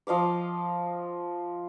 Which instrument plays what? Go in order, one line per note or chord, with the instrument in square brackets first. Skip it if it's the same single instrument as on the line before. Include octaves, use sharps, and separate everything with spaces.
[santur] F3 D#5 F5 D6